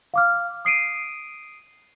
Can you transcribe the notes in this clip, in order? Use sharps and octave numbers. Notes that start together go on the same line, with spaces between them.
F5 D6 F6
D#6 C7 D7 D#7